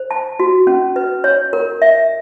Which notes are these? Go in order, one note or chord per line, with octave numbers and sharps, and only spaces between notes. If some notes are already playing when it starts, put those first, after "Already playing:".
Already playing: C5
A5
F#4
C#4
B4
C#5
A#4
E5